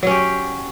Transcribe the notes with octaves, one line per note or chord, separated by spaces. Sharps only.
F#3 C#4 G4